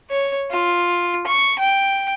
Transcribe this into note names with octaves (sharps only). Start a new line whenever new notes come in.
C#5
F4
C#6
G5